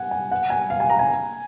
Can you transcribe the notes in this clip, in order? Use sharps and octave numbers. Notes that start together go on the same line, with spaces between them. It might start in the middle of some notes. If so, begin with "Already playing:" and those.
Already playing: F#5 G#5
G#5
F#5
G#5
F5
G#5
A#5
G#5